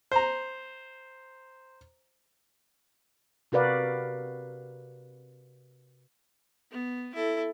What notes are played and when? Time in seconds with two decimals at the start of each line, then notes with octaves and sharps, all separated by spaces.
0.12 C5 A#5
3.52 C3 F#4 A#4 B4 D5 F5
6.71 B3
7.15 E4 A4